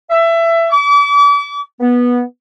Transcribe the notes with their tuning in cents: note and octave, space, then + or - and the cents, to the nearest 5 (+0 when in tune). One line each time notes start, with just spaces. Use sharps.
E5 +20
D6 -40
B3 -15